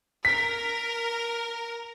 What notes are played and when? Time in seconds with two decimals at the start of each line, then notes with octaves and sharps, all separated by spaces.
0.25 A#4 B6